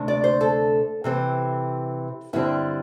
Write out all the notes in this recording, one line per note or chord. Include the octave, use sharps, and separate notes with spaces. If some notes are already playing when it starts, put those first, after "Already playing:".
Already playing: D2 C3 A3 D4
D5
C5
A4
C3 E3 C4
G2 D3 G3 C4 E4